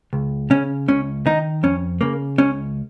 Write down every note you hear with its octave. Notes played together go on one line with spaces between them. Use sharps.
C#2
C#3 C#4
C#2 C#4
D#3 D#4
F2 C#4
C#3 A#3
C#2 C#4